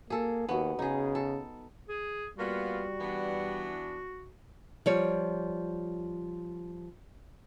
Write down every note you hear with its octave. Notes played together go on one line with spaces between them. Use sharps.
A#3 G#4 A4
D#2 B3 F#4
C#3 D#4 G#4
A4
G#4
G3 A#3 B3 F4 F#4
E3 B3 D4
F3 G3 C#5